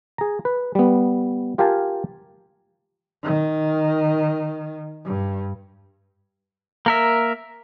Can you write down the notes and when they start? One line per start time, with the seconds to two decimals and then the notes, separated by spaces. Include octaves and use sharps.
0.18 G#4 A#5
0.45 B4
0.75 G3 B3
1.58 F4 G4 A#4 F5 G#5 A5
3.23 D#3
5.05 G2
6.86 A#3 A#4 E5